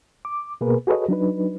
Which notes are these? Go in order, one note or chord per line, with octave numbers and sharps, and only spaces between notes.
D6
B2 A#3 G#4 A#4 B4
F#4 G#4 A4 B4 C#5 D#5
F#3 D4 D#4 B4